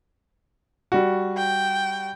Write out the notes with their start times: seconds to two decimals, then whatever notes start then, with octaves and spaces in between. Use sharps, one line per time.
0.92 G3 F#4
1.37 G5